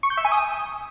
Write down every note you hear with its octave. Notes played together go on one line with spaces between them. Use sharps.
C#6
G6
E5
G#5
D#6